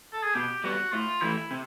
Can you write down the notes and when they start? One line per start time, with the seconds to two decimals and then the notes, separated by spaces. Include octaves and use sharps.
0.13 A4
0.23 G#4
0.34 B2 G4
0.64 G3 B3 F#4
0.93 A2 F4
1.22 E3 A3 E4
1.51 C3